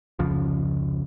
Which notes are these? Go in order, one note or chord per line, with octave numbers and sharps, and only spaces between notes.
F1 C#2 C#3 F3